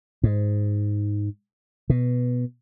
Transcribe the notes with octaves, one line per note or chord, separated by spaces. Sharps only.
G#2
B2